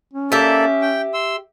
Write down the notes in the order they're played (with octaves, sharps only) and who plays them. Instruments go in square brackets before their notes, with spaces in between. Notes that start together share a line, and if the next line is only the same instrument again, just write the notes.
[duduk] C#4
[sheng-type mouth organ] A#3 A4 D5 [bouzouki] G4 E5
[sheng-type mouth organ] G5
C6 E6